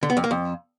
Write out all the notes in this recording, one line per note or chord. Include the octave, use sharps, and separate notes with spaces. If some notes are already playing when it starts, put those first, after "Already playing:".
D3
B3
F2
A#3
F2